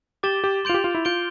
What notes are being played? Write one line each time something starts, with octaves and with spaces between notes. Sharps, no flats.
G4 D6 A6 E7 G7
G4
F4 C6 G6 D7 F7
G4
F4
E4
F4 G6 D7 G7